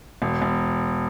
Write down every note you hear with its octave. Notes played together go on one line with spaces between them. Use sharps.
E1
E1